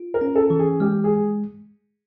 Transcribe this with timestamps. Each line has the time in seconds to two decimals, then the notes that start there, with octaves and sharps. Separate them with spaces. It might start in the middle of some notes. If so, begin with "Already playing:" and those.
Already playing: F4
0.14 A#4
0.21 C#4
0.36 A4
0.50 E3
0.59 G#4
0.80 G#3 G4
1.04 G#4